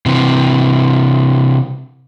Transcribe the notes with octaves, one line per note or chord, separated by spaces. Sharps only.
C3 E3